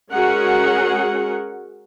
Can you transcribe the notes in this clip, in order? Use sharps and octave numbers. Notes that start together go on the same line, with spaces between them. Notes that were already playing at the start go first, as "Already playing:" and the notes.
G#3 C#4 F#4 G#4 A#4 F#5